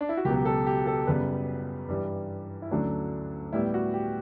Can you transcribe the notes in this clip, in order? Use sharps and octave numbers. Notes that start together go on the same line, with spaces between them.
D4
E4
F#4
C#2 B2 F#3 G4
G4
A4
G4
A4
F#2 C#3 G3 B3 B4
G2 E3 G3
E4
D2 D3 F#3 A3 C#4 D4
A2 G3 B3 E4
G4
F#4
G4